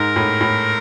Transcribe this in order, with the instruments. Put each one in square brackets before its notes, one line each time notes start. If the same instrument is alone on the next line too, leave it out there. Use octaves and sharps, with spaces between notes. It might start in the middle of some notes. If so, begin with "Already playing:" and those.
Already playing: [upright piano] G#2 [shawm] A#4
[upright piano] A2
A2